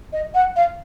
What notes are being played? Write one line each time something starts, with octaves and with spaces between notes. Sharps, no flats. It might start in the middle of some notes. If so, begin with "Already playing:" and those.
D#5
F#5
F5